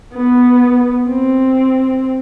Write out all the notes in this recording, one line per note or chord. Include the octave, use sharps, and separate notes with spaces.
B3
C4